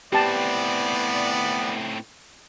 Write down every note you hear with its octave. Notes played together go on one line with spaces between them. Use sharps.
A2 B3 C4 G4 D5 A5